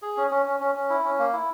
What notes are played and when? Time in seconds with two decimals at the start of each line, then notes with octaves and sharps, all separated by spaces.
0.02 G#4
0.17 C#4
0.31 C#4
0.46 C#4
0.60 C#4
0.75 C#4
0.90 E4
1.04 C#4
1.19 A#3
1.33 E4